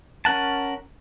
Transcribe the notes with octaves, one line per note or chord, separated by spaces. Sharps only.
C#4 A#4 F#5 A5